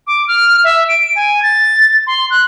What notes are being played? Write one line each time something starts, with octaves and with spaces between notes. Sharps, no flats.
D6
F6
E5
D7
G#5
A6
C6
F#6